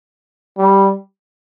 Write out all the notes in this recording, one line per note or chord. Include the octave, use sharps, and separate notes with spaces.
G3